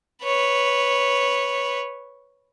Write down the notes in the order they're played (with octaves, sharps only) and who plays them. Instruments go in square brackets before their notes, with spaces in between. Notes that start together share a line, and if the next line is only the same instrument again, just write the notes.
[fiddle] B4 C#5